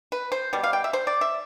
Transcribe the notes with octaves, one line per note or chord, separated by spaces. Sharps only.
B4
C5
B2 G3
F5
G5
E5
C5
D5
E5